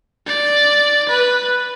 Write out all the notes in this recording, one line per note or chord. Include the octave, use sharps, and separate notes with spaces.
D5
B4